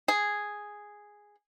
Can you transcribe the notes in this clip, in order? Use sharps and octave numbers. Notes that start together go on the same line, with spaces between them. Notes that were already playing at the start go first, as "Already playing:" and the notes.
G#4